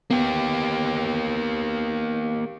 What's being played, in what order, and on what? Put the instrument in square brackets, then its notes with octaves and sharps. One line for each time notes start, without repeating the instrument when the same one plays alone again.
[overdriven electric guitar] A#3 G4 [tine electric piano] B3